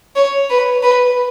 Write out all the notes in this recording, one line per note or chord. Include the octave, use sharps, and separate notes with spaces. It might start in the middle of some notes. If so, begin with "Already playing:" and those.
C#5
B4
B4